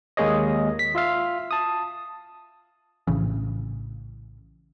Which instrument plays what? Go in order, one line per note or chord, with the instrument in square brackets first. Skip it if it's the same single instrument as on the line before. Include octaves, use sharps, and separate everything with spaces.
[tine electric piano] D#2 G#3 A#3 G#4 C#5 D#5
B6
F4 E5 F5
A5 D#6
[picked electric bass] A#1 A2 C#3 E3